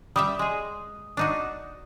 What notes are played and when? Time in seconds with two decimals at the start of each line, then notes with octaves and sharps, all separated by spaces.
0.16 G3 G4 E5 D#6
0.39 G#3 G#4
1.17 D4 D#4 F#4